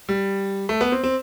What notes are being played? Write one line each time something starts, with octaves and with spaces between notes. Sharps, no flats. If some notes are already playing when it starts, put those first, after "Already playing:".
G3
A3
B3
C4
C4